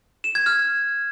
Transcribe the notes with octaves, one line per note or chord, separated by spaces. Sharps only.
E7
G#6
F6